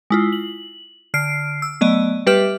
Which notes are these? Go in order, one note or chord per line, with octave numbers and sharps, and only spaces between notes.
G#3 E4 F4
F#7
D3 F6 C7 D7
E6
F#3 A3 B3 D5 D#5
G3 G4 B4 E5 F6